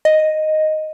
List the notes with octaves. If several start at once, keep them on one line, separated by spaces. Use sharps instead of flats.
D#5